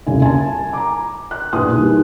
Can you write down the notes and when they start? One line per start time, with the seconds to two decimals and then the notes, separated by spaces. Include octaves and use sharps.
0.07 D#1 C2 C#3 G#5
0.22 G#5 A5
0.73 A#5 D6
1.31 F#6
1.53 A#1 E2 B2 G#5 D#6 F#6
1.75 D#3 G3